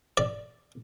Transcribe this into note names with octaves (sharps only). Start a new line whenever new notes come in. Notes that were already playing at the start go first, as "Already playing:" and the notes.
D5